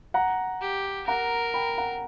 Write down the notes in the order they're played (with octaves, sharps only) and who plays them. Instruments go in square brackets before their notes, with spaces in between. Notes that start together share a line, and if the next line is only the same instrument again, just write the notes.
[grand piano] F#5 A#5
[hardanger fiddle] G4
[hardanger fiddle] A#4 [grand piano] F#5 A#5
[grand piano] G5 B5
F#5 A#5